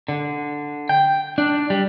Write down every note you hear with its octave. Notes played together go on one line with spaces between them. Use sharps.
D3
G5
D4
G3